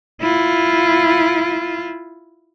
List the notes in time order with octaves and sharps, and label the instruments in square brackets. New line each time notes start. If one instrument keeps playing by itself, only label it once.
[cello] E4 F4